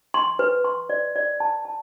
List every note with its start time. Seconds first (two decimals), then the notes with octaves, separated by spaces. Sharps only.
0.14 C6
0.39 B4
0.64 C6
0.90 D5
1.16 D5
1.40 A5
1.65 A5